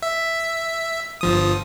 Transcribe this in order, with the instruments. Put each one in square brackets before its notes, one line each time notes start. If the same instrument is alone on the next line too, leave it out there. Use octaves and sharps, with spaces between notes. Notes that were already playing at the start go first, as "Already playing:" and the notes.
[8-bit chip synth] E5
G1 F3 D#6